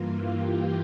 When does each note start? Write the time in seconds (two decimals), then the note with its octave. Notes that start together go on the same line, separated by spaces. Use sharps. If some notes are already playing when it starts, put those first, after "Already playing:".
Already playing: G2 E3 A#3 F4
0.17 G4